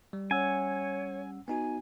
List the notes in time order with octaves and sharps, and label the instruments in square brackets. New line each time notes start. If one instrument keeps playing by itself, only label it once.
[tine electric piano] G3
[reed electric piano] C#4 F#5 E6 [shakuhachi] C#5 [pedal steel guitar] G#5
[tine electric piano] B3 D#4 F#4 [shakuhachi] G#5